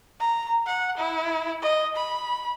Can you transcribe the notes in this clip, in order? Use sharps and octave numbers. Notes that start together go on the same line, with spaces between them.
A#5
F#5
E4
D#5
B5